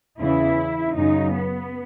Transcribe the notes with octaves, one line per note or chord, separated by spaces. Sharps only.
E2 C#3 E3 E4
F#2 C#3 F#3 D#4
B3